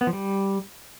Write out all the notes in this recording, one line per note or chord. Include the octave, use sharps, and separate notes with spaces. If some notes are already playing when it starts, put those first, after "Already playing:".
B3
F3
G3